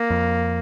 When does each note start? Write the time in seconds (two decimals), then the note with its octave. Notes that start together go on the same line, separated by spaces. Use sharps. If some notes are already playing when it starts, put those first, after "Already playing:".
Already playing: A#3
0.10 F2